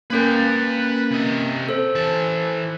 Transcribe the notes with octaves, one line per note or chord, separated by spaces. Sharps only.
A#3 C#4 A#4 B4 G5
C3 D#5
A4 C5
E3 A5